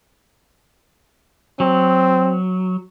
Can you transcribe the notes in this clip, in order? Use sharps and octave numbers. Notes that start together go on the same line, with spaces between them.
F#3 C4